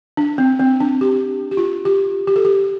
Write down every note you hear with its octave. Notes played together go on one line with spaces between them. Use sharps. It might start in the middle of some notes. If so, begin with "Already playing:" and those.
D4
C4
C4
D4
G4
G4
F4
G4
G4
A4
G4